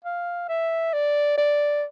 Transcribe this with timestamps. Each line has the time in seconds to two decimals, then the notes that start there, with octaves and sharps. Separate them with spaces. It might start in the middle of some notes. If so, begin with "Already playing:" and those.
0.04 F5
0.49 E5
0.93 D5
1.38 D5